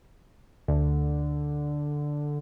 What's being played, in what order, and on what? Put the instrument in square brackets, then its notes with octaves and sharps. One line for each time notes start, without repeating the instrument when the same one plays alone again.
[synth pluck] D2 [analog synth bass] D3